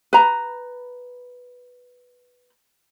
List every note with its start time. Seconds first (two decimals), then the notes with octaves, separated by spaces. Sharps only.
0.13 B4 A#5